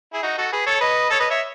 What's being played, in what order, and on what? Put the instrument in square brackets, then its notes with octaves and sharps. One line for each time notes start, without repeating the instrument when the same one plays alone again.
[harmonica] E4 G#4
D#4 F#4
F#4 A4
G#4 B4
A4 C#5
B4 D#5
A4 C#5
B4 D#5
C#5 E5